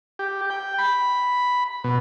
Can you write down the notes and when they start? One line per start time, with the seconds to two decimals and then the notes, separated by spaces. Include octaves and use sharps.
0.19 G4
0.50 G5
0.78 B5
1.84 B2